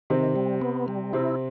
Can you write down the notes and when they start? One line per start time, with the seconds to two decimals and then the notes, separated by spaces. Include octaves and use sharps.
0.10 C3 D#3 C4
0.36 G3
0.62 B3
0.88 G3
1.13 C3 C4 E4